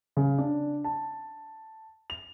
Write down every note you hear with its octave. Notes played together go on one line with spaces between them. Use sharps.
C#3
D4
A5
F7